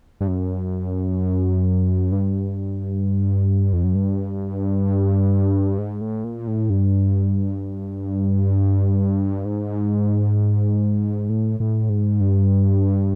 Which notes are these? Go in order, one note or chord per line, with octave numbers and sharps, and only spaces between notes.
G2
F#2
G2
F2
F#2
G2
G#2
A2
A#2
A2
G2
G#2
A2
A2
G#2
G2